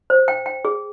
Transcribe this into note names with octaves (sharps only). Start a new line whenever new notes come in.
C5
G5
G5
G#4